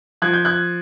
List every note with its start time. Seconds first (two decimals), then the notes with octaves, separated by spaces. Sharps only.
0.22 F3 F#6 G#6
0.34 G6
0.45 F#6 G#6